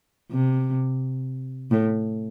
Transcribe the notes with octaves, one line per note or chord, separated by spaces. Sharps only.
C3
A2